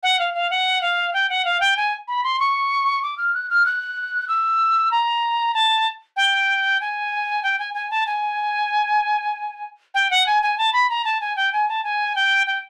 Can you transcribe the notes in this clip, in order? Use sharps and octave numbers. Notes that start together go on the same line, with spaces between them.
F#5
F5
F5
F#5
F5
G5
F#5
F5
G5
G#5
B5
C6
C#6
D6
F6
F#6
F6
F#6
E6
A#5
A5
G5
G#5
G5
G#5
G#5
A5
G#5
G5
F#5
G#5
G#5
A5
B5
A#5
A5
G#5
G5
G#5
A5
G#5
G5
G5